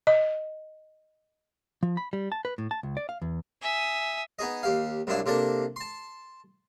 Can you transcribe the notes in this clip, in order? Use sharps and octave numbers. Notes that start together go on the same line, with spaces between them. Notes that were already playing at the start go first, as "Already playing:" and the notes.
D#5
F3
B5
G3
A5
B4
A2
A5
C#2
D5
F5
E2
E5 G#5 D#6
B3 D#4 G#4 D#5
D#2 G4 F5
C2 F#2 D4 E4 F5
C3 A#3 D4 A4 A5
A5 C6